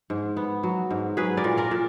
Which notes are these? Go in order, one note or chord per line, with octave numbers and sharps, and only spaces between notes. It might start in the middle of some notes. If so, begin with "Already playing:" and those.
G#2
B3
F#3
G#2
F#3 G#4 B4
A#4 D5
A#2
A#4 D5
A#2